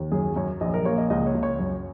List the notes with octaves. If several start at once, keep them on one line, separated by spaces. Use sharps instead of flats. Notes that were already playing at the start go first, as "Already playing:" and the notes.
Already playing: D#2
F#2 G#4
F#2 C#5
A#1 D#5
A#4
A#3 C#5
D#5
C#2 D#5
C#5
C#2
C#5
F#2